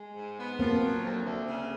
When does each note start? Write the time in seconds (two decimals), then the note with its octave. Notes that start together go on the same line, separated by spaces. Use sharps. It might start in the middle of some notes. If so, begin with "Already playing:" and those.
Already playing: G#3
0.15 G#2
0.38 B3
0.59 F3 A#3 C4
0.82 F#3
1.03 D2
1.25 D2
1.48 C#3